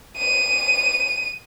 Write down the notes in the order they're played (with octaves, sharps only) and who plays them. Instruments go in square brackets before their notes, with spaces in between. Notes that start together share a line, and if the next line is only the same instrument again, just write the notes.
[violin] D#7